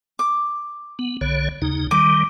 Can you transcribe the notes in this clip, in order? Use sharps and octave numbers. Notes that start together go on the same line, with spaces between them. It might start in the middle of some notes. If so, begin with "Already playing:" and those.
D6
B3
B1 D3 C#5
D#2 C#3 D#4
D#3 G3 D6